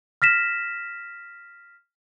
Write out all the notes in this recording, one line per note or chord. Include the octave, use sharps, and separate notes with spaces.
F6 A#6 B6 E7